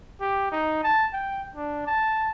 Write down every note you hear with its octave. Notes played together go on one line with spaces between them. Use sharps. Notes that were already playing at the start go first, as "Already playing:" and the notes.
G4
D#4
A5
G5
D4
A5